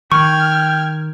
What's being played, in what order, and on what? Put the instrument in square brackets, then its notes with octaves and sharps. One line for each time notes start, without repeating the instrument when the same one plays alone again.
[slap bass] D#3 [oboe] G5 [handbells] C#6 [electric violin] F6 G#6